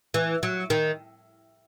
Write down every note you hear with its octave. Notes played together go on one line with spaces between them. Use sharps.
E3
F#3
D#3